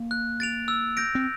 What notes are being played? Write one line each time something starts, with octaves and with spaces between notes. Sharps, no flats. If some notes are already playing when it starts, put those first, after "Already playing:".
Already playing: A#3
F#6
A6 D7 F7
E6
G6 A#6 D7
C4